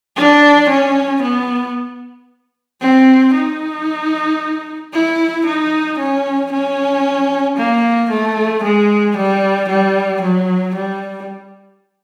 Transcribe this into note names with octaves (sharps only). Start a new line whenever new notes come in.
D4
C#4
B3
C4
D#4
E4
D#4
C#4
C#4
A#3
A3
G#3
G3
G3
F#3
G3